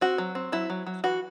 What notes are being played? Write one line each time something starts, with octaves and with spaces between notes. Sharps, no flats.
C4 F#4
F#3
C4
F#3 E4
F#3
F#3
E3 F#4